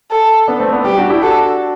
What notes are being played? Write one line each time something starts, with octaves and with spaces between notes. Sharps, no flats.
A4
B3 D4
A3 C4
B3 D4
G3 G4
D4 F#4
E4 G4
D4 F#4 A4